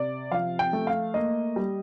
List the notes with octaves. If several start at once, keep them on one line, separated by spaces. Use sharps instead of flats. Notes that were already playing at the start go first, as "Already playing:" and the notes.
Already playing: C3 D5
F3 F5
G5
A3
F5
A#3 D#5
G3